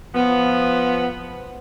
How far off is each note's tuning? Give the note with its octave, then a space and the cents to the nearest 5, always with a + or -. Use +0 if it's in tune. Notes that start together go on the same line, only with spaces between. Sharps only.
F3 +0 B3 +0